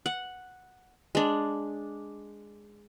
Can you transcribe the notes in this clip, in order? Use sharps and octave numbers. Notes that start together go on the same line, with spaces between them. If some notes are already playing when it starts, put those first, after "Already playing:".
F#5
G#3 D4